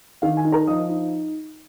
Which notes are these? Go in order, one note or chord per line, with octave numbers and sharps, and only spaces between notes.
D#3 F5
G#5
D#4
A#4 A#5
F3 D#5 D#6
D#4